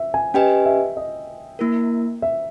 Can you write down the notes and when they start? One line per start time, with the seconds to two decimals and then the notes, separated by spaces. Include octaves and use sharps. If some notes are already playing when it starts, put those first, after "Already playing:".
Already playing: E5
0.14 G#5
0.34 C#4 G4 B4 D#5 G5 G#5
0.65 E5
0.97 D#5
1.59 A#3 E4 A#4
2.22 E5